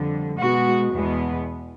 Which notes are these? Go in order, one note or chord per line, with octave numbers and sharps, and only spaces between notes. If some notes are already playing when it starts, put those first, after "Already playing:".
Already playing: F2 D3 G3
B2 G#3 B3 F#4
E2 B2 G#3 B3